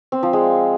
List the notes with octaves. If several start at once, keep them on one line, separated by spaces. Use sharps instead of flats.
C4
F3
G#3